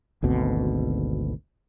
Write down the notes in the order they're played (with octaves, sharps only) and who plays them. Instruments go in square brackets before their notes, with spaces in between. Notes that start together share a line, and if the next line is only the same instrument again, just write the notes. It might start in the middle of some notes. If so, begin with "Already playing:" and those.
[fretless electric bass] G#1 D2 B2 C4